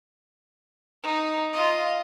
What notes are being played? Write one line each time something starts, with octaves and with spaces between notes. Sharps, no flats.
D#4
F4 D#5